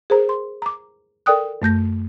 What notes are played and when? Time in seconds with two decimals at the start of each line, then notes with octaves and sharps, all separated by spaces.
0.10 G#4 A#4 C5 A#5
0.29 C6
0.62 A#5 D6
1.26 A4 A#4 D5 G5 D#6 F#6
1.62 F#2 A3 G6 A#6